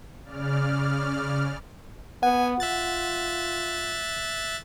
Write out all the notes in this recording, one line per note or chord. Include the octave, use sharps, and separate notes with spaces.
C#3 D5 F6
B3 F#5 G#5
F4 E5 F#6 A6